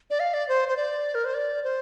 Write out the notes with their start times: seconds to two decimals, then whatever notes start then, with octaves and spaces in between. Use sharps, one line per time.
0.10 D5
0.20 F5
0.34 D5
0.49 C5
0.68 C5
0.77 D5
1.15 A#4
1.25 C5
1.34 D5
1.64 C5